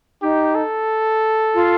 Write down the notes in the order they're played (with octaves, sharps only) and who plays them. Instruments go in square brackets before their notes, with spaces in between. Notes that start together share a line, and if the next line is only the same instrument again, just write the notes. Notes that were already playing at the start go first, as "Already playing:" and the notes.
[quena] D#4 [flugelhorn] G4
[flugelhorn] A4
[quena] F4